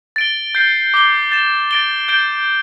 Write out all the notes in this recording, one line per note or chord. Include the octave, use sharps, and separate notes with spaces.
A6 D7 G7
G6 C7 G7
D6 C7 G7
A6 E7 G7
A6 D7 G7
G6 D7 G7